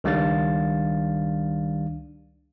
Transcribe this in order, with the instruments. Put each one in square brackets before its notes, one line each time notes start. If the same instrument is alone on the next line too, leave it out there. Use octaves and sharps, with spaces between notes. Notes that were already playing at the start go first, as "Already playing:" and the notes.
[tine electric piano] C#2 D#3 G3 D4 F5 A6